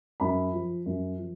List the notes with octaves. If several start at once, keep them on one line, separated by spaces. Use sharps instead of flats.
F#2 B5
F3
F#2
F3